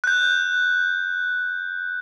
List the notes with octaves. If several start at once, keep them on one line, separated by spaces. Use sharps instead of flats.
F#6 G6